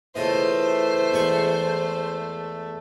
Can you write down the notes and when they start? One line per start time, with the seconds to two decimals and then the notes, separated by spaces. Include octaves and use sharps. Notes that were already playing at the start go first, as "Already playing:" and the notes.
0.15 C#3 E3 A3 F4 C5 D#5
1.12 E2 G#3 C#6